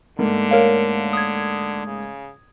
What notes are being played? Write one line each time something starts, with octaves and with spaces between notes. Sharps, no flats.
G#2 D3 A3 A#3
A#4 C#5 F5
D#6 G#6
C#3